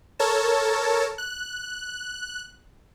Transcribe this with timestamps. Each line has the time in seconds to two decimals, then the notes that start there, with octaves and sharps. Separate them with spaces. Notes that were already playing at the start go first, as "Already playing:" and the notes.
0.19 A4 A#4 C#5 A5
1.18 F#6